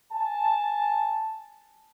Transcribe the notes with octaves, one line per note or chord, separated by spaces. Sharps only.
G#5 A5